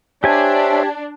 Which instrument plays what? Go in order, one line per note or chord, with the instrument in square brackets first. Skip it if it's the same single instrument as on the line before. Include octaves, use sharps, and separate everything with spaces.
[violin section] D4 [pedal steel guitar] G4 G#5 [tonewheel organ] C5 C#5 E5